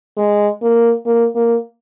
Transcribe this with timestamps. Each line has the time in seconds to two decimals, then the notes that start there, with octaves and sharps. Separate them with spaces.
0.17 G#3
0.62 A#3
1.06 A#3
1.35 A#3